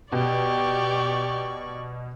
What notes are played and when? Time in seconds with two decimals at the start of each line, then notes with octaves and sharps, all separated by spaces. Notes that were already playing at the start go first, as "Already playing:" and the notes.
0.12 B2 G4 D5 C#6